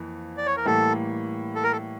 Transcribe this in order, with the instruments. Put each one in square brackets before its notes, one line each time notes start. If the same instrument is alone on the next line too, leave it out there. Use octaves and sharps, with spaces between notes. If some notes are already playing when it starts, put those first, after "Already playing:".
Already playing: [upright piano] F2 E3 A#3
[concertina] D5
C#5
A#4
[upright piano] A2 E3 G3 A#3 [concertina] A4
[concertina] A4
A#4
A4